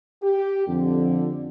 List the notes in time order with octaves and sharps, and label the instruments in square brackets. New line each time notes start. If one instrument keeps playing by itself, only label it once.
[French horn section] G4
[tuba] F2 [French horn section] D3